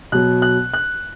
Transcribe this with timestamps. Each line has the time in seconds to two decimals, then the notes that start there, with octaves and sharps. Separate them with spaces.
0.12 B2 F#3 F#6
0.42 F#6
0.74 F#6